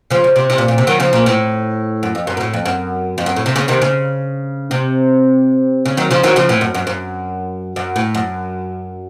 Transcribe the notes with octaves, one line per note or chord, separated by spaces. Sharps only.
C#3 F3
C#3
C3
C3
A#2
A#2
C3
D#3 F#3
C#3 F3
A#2
A2
F#2
F2
F#2
A#2
A2
F2
F#2
F2
F#2
A2
C3
C#3
C3 D#3
C#3
C3
C#3
D#3 F#3
C#3 F3
D#3 F#3
C#3 F3
A2
F#2
F#2
F#2
F#2
A2
F#2